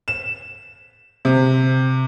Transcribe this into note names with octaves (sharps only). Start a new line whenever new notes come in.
E7
C3